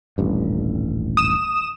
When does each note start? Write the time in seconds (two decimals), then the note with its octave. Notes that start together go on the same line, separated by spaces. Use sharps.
0.18 D#1 A1 G2
1.17 D#6 E7